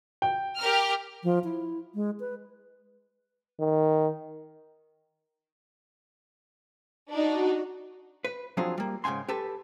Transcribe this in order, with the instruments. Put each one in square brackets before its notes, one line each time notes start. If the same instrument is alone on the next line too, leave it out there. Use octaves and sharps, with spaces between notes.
[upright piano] G5
[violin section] G4 A#4 F6
[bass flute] F3
E4
G#3
B4
[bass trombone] D#3
[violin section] D4 D#4 [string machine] F#4
[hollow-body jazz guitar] B4
F3 F#3 C4 D4 F4 G#4
G3 A#3
G#2 C#3 G5 G#5 C6
G4 A4 B4 A5